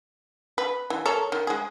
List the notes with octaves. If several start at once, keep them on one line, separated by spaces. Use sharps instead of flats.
B4
E3
A4 A#4 C#5
D#3
G#3 G#4